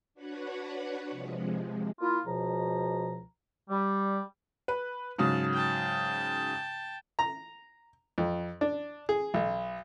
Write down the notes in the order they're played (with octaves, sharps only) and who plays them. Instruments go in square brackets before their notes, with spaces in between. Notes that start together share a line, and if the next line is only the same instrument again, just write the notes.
[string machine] D4 F#4 B4 C#5 F#5 B5
C3 F3 G#3
[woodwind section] A#3 E4 F4
C#2 B2 F3 A#5
G3
[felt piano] B4
[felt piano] G#2 C#3 F#3 [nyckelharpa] A5
[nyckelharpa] G5 A5
[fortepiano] A#5
F2
D4
G#4
B1